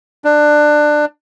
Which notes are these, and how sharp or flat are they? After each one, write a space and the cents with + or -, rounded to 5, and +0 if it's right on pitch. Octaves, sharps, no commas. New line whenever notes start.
D4 +20